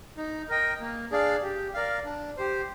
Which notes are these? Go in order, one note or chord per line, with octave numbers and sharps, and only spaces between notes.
D#4
A#4 D#5 G5
A#3
D4 G#4 D5 F5
G4
A#4 D5 F5
D4
G4 C5